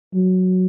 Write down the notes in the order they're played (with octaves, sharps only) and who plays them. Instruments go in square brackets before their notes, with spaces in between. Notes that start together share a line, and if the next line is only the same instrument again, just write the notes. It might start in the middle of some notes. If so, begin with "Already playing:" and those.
[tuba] F#3